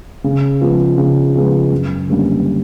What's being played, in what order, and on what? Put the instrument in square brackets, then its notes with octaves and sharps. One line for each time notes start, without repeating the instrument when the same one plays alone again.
[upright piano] C#3
F3 G#3 B3
C#3
F3 G#3 B3
F#2
D3 G3 A#3 C#4